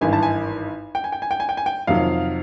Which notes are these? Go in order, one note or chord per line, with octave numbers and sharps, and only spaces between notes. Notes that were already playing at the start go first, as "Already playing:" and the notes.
G#1 G2 E3 G#5
A5
G#5
G5
G#5
G5
G#5
G5
G#5
G5
G#5
G5
F2 C3 D#3 F#3 F5